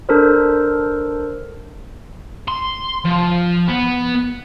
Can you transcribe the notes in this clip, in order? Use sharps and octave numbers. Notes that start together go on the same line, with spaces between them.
D4 A4 A#4 C5
C6
F3
B3